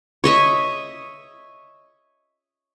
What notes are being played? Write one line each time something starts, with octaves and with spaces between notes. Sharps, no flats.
C#5 D#5 E5